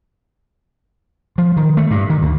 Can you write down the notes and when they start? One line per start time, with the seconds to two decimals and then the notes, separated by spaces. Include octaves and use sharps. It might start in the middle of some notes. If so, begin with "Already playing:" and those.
1.38 F3
1.57 D#3
1.77 A3
1.91 G2
2.10 D#3
2.21 D2